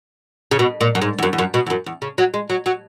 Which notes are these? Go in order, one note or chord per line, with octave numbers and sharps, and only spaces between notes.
C#3
B2
A#2
F#2
G#2
E2
F#2
E2
F#2
B2
E2
F#2
E2
C#3
F#3
G#3
F#3
F#3